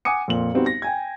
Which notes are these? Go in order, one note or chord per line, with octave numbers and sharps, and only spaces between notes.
F#5 G#5 D6 D#6 C#7
F2 A#2 F#7
G3 B3 C4 D#4 F#4
A#6
G5 G#5 G#6